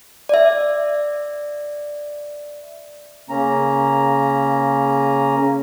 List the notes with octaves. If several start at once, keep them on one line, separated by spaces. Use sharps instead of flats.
D5 E5
C#3 A#3 C#4 A#5